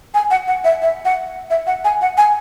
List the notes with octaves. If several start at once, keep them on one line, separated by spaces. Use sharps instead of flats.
G#5
F#5
F#5
E5
E5
F#5
E5
F#5
G#5
F#5
G#5